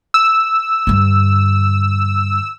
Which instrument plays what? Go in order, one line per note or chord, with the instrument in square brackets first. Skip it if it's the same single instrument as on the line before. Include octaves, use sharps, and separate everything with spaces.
[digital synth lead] E6
[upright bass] G2 D3